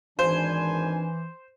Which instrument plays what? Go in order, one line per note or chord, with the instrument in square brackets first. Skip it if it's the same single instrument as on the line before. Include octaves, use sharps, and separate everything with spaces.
[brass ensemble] G#1 D4 G#5 [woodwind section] E3 [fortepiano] C5